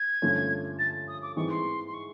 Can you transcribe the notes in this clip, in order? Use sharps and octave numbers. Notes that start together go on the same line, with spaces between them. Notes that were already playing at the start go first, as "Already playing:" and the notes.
Already playing: G#6
G2 D3 F3 A3 C#4
A6
D#6
D6
G#2 E3 G#3 C4 C#6
C6
C6
C#6